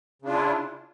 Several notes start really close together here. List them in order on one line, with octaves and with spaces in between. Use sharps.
C#3 D4 F4 E4